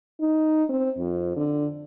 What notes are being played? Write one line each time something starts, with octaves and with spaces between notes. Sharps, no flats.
D#4
C4
F2
D3